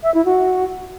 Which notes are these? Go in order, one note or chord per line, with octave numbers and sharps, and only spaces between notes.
E5
E4
F#4